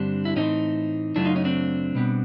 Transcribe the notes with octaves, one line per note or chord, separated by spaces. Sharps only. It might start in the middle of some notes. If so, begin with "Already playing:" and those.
Already playing: G2 D3 G3 C4 D4
E4
A2 E3 A3 C4 C#4 D#4
F#2 C#3 F#3 A3 D4 E4
D#4 F4
C#4 D#4
C4 D4
B2 G3 B3